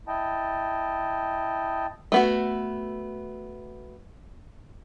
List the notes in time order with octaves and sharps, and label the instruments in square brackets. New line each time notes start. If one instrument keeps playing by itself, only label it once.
[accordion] E4 D#5 G5 A5
[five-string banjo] A3 B3 F#4